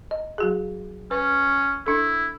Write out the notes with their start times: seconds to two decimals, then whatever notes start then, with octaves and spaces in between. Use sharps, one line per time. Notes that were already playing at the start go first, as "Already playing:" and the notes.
0.11 D#5
0.38 F#3 F#4 G#4
1.11 C#4 B4
1.87 D4 E4 A4